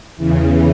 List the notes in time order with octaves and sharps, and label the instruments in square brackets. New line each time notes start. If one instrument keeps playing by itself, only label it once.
[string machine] E2 C#3 E3